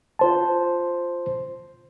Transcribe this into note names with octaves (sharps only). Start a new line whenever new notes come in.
F4 C5 A5